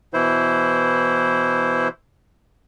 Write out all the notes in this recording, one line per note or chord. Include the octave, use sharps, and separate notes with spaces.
B2 E3 E4 C5